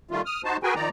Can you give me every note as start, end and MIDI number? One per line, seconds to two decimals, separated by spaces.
0.11 0.22 51
0.11 0.22 55
0.11 0.22 57
0.11 0.22 65
0.26 0.42 87
0.26 0.42 89
0.44 0.57 63
0.44 0.57 66
0.44 0.57 72
0.44 0.57 81
0.63 0.74 66
0.63 0.74 68
0.63 0.74 70
0.63 0.74 71
0.63 0.74 79
0.63 0.74 80
0.75 0.89 51
0.75 0.89 53
0.75 0.89 63
0.75 0.89 74
0.75 0.89 82